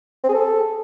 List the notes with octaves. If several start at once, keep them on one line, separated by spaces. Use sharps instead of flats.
C4
G#4
A4